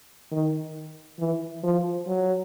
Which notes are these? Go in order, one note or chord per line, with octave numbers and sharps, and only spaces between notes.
D#3
E3
F3
F#3